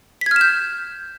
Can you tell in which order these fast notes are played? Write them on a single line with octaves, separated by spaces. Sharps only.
B6 G#6 F6 E7 G6